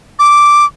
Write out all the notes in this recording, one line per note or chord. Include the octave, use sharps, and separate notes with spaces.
D6